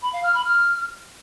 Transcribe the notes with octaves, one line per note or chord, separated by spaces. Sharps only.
B5
F5
F6
B5
F6